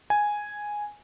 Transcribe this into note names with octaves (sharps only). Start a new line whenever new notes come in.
G#5